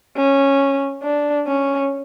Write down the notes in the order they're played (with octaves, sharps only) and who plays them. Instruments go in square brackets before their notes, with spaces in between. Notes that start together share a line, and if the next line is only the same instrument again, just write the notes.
[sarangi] C#4
D4
C#4